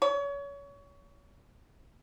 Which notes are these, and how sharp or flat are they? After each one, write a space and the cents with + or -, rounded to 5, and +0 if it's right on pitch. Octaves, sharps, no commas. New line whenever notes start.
C#5 +30